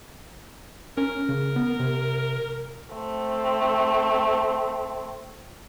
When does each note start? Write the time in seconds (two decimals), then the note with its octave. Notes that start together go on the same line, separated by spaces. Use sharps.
0.97 C#4 A#4
1.29 C#3
1.56 B3
1.80 C3
2.93 A3 C4